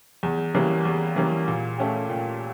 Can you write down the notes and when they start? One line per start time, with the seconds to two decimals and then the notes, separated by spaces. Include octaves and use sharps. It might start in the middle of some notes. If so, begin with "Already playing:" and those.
0.23 E2
0.54 E3 G3 A#3 C#4
0.85 E2
1.16 E3 G3 A#3 C#4
1.48 A#2
1.78 A3 C#4 G4
2.09 A#2